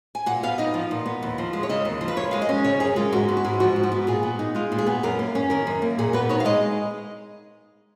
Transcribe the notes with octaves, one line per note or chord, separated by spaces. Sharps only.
G#5
A#2 F#5
B3 F5
D#4 D#5
F3
A#2
B3
D#2
F3
G#3
C#5
C#3 D#5
D#2
F3
B4
F#2 C#5
G#3 F5
D#5
C#4
C#3 C#5
F#2 G#4
G#3 F4
G#2 F#4
B3
F#4
G#2
F3 F#4
G#2
F#4
B3
A#2 G#4
B3
D#4
G#3 F4
A#2
G#4
B3
F#2 A#4
A#3
C#4
D#3 A#4
F#2
A#3
A#2 G#4
B3 B4
D#4 C#5
F5
G#3 D#5